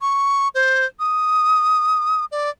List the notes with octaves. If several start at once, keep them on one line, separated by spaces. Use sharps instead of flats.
C#6
C5
D#6
D5